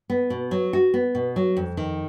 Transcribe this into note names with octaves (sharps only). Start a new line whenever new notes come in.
B3
B2
F#3
F#4
B3
B2
F#3
F2
D#3